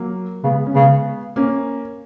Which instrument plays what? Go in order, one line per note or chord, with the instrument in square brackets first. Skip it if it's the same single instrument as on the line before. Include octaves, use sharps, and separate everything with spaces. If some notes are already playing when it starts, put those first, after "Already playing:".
Already playing: [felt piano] F#3 A#3
[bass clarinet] C#3 [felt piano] G#3 B3
[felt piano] C#4
[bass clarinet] C#3 [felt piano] G#3 B3
[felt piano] A#3 C#4